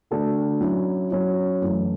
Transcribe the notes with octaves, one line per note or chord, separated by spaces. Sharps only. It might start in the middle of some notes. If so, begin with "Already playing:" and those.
D3 A3 D4 F#4 A4
F#3 C#4 E4
F#3 C#4 E4
F#2 E3 A3